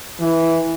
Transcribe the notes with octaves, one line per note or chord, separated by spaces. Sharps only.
E3